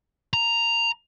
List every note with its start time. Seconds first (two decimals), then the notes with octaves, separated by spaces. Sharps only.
0.33 A#5